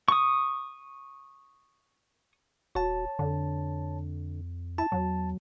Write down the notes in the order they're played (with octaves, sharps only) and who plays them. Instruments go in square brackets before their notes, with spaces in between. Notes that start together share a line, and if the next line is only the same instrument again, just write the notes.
[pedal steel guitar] C#6 D#6
[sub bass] D#1 [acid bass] F#4 [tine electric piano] C#5 A5
[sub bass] F2 [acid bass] D3
[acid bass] E4 [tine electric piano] A5
[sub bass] E2 [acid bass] F#3